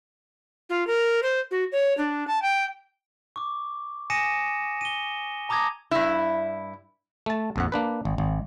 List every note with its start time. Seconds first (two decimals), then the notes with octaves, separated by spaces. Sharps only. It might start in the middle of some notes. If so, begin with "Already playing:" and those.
0.70 F4
0.87 A#4
1.23 C5
1.51 F#4
1.72 C#5
1.98 D4
2.28 A5
2.42 G5
3.36 C#6 D6
4.10 G#5 D#6 A#6 C#7 D#7 E7
4.81 D#7 G7
5.49 A5 A#5 D6 D#6 G#6 A#6
5.91 G2 E4
7.26 A3 A5
7.56 A#1 F2 F#5
7.72 A#3 D4 B4
8.05 G#1
8.18 G#1